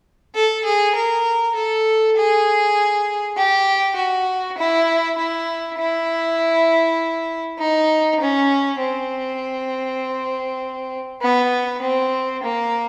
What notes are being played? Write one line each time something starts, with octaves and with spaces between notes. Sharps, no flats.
A4
G#4
A#4
A4
G#4
G4
F#4
E4
E4
E4
D#4
C#4
C4
B3
C4
A#3